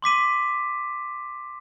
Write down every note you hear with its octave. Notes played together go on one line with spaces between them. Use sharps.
C6 D6 B6 D#7